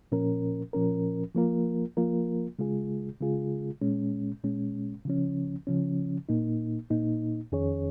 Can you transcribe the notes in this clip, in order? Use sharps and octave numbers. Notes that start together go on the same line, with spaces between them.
A#2 F3 C#4 A#4
A#2 F3 C#4 A#4
F3 A#3 F4 A#4
F3 A#3 F4 A#4
C#3 G#3 F4 G#4
C#3 G#3 F4 G#4
A#2 G#3 C#4
A#2 G#3 C#4
C#3 F3 C#4
C#3 F3 C#4
A#2 A#3 D#4
A#2 A#3 D#4
F2 D#3 C#4 G#4 C#5